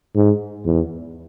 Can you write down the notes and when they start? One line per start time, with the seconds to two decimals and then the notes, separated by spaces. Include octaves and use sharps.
0.15 G#2
0.65 E2